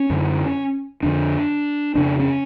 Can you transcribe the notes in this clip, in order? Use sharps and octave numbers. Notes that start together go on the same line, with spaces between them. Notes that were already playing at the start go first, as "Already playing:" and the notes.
Already playing: C#4
F#2 D3
F2 D3 D4
F2 C#3 D4
C#4